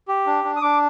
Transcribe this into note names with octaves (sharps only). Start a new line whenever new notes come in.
G4
D4
D4
D#6
D4 D6